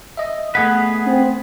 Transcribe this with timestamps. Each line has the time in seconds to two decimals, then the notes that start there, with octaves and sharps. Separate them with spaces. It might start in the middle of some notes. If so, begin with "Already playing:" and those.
0.17 D#5 E5
0.55 A3 B3 G#4 B4 F#5
1.07 C4